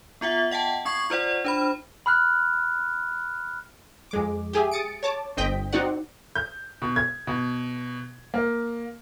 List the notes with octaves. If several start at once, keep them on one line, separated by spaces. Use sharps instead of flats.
B3 F4 E5 F#5
D#5 F#5 G5 A5
C4 C#6 G#6 C7
F4 C5 D5 F#5
D4 C5 B5
B5 F6 F#6
F2 G#3 D6
G4 G#4 E5 G#5
D#6 A6 C#7 D7
C#5 A5 D6
G1 C4 D#5 G5 G6 B6
C4 D#4 F#4 D5 F#5
G6
B2
G#6
B2
A#3